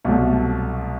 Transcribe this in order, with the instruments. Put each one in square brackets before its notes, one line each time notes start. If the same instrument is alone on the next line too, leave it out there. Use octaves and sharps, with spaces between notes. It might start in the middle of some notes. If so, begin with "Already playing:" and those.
[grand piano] C2 B2 F#3 A3